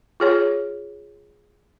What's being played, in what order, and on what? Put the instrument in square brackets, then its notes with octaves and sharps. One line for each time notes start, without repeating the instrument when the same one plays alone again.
[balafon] F4 G#4 C#5